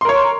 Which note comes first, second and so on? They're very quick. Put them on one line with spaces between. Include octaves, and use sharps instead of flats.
C6 A#4 C#5